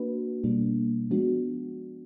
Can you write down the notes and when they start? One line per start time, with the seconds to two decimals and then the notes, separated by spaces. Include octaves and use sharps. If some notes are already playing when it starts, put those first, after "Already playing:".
Already playing: A#3 D4 F#4 B4
0.44 B2 G3 A#3 D4
1.11 F3 G#3 B3 D4 F#4